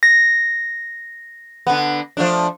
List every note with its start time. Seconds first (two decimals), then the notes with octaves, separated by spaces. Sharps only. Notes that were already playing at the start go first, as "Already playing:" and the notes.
0.03 A#6
1.67 D3 B3
2.17 F3 A3 D4